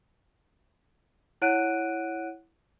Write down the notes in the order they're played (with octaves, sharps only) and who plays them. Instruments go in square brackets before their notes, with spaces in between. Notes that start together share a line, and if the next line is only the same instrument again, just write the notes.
[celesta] E4 C#5 F#5 F#6 D7 D#7